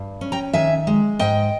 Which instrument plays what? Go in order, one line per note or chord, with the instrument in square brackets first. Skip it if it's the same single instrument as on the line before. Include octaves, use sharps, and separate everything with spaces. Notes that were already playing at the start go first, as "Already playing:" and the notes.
Already playing: [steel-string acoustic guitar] G2
C#4
G5 A#5
D#3 E5 G#5
G#3
G#2 D#5 G5